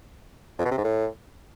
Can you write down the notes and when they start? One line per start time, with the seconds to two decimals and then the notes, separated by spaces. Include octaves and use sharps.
0.59 F2
0.65 B2
0.72 C3
0.78 G#2
0.84 A2